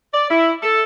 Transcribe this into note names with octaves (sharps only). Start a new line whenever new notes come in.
D5
E4
A4